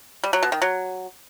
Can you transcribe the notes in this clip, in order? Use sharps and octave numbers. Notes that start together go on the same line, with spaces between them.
G3
F#3
B2
D#3
F#3